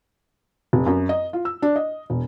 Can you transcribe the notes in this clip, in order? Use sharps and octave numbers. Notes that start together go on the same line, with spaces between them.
F1
F#2
D#5
F4
E6
D4
D#5
E1